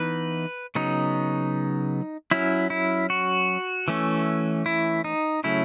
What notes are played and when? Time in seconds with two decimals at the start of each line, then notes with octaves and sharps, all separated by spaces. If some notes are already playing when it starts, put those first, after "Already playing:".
Already playing: E3 B3 D#4 B4
0.75 C#3 F#3 B3 D#4
2.31 F#3 C#4 E4
2.70 E4
3.10 F#4
3.88 E3 A3 C#4
4.66 E4
5.04 D#4
5.44 C#3 F#3 A3 C#4 E4